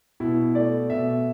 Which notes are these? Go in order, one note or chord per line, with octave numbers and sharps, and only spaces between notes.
B2 E4
A3 D5
B2 E5